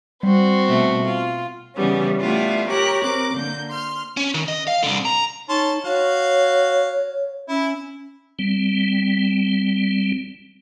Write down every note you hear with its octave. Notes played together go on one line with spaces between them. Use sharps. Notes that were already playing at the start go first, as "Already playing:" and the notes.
G3 C4 F#4
B2 A3
F4
C#3 E3 G3 B3 C#4
G3 A3 B3 E4 F4
G4 A#4 C#5 A#5 F#6
C4 A#4 D6 F#6
D3 A#3 G6
C6 F6
C#4
D#3
D#5
F5
C2 D3
A#5
C#4 D#4 A5 C6
F#4 C#5 F5
C#4 E4
G3 C4